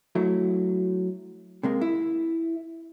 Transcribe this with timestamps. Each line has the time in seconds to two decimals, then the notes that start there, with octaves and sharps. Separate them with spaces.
0.15 F#3 A3 E4
1.63 C3 G#3 A#3
1.81 E4